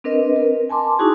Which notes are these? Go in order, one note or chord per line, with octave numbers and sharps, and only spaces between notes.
C4 D4 A#4 B4 D#5
A#4
G#5 A5 C6 D6
D#4 E4 F#4 G#4 C#6